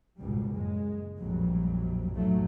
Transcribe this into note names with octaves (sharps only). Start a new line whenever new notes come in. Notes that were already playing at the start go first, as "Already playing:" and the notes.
G#1 C#2 B2 G3
F#1 A#2 G#3
A#1 F2 F#3 G3
B1 F2 A2 F3 F#3 A3